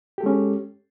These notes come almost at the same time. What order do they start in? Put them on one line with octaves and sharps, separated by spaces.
G4 A4 G#3 C#4